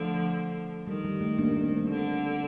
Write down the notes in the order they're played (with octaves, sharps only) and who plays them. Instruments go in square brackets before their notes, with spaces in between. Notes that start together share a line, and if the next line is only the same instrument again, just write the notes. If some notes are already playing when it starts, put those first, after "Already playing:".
Already playing: [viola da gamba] D3 F3 [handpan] A3
[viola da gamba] D#3 [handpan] G3
[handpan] G3
A3
A#3 D4
A#3 D4
A3 C4
G3 A#3
[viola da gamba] D3